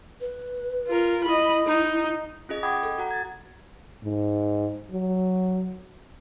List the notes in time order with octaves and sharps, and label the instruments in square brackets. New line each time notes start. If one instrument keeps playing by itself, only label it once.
[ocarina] B4
[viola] F4 A#4
[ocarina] E4 [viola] D#5 B5
[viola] D#4
[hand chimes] C#4 F4 G#4 D#5
F#5 G5 B5 D6 D#6 G#6
A4
F#4 F#5 A#5
G#6 A6
[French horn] G#2
F#3